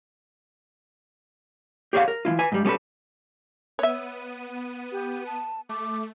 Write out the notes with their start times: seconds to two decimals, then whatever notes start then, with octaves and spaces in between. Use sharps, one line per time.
1.93 G4 G#4 C#5 D5 F5 F#5
2.08 A#4
2.25 E3 A3 E4 F4
2.39 B4 G#5
2.52 G#2 G3
2.65 G3 B3 C#4 G#4 A4 B4
3.79 B3 C#5 E5 D#7
4.92 G4
5.26 A5
5.69 A3 D6